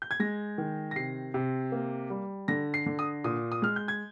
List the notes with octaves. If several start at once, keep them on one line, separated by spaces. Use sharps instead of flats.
G6
G#6
G#3 A#6
D#3
A#6
C3 C7
C3
A#3
G3
D3 A#6
C7
D3
D#6
A#2 D#6
D#6
G#3 F6
G6
G#6